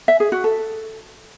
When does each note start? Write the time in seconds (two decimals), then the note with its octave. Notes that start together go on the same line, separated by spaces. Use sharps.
0.08 E5
0.20 G#4
0.32 F#4
0.44 A4